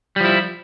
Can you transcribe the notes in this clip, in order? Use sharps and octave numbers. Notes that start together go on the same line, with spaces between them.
F3 G3 E4